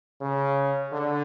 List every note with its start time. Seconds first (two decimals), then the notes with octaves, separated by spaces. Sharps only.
0.21 C#3
0.92 D3